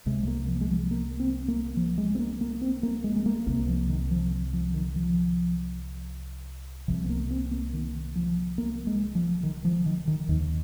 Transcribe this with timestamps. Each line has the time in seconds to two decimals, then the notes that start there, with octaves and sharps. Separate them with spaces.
0.06 C2 C3 G#3
0.23 G#3
0.28 A#3
0.49 F3
0.61 G#3
0.70 F3
0.91 A#3
1.20 C4
1.48 A#3
1.77 F3
1.98 G#3
2.15 C4
2.19 A#3
2.41 A#3
2.61 C4
2.83 A#3
3.04 G#3
3.16 G#3
3.26 A#3
3.47 C2 C3 A#3
3.68 F3
3.89 D#3
4.11 F3
4.53 F3
4.74 D#3
4.96 F3
6.88 C2 C3 F3
7.04 C4
7.09 A#3
7.30 C4
7.51 A#3
7.73 D#3
8.16 F3
8.58 A#3
8.87 G#3
9.15 F3
9.43 D#3
9.65 F3
9.86 D#3
10.08 D#3
10.29 D#2 D#3